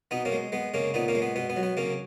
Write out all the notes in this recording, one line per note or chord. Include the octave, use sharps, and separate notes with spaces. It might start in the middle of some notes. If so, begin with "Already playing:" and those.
B2 B3 D#4
A#3 C#4
G#3
G#3 B3
C#3 A#3 C#4
A#2 B3 D#4
A#3 C#4
G#3
B3
B2 B3
B3
F#3
B3
C#3 A#3 C#4